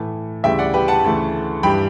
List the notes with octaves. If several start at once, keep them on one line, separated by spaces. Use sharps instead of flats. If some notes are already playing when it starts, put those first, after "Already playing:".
Already playing: A2 E3 A3
D2 C#3 E3 G3 E5 G5
D5 F#5
G4 B4
F#5 A5
D2 C#3 E3 A3
G2 E3 G3 G5 B5